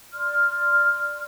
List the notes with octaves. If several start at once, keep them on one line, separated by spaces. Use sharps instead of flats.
D5 C6 F6